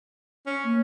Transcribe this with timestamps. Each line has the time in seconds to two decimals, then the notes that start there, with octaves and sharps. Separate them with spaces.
0.47 C#4
0.64 A#3